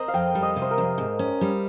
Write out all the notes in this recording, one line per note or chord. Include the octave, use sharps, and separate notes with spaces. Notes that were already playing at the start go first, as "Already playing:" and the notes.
Already playing: C4 A#4 C5 D#5
F5
F2 G5
G3
D#5
C3
C5
A#4
F2
G#2
C#4
G3